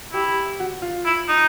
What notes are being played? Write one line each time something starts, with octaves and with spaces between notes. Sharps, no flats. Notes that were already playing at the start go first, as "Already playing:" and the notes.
E4 G4
F#4
F4
E4
D#4